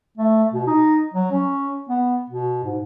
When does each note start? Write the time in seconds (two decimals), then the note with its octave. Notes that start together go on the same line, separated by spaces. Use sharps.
0.18 A3
0.54 B2
0.67 D#4
1.14 F#3
1.31 C#4
1.89 B3
2.30 B2
2.64 G#2